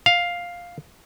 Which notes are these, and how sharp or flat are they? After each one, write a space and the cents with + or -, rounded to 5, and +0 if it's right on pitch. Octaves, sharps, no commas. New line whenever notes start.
F5 +5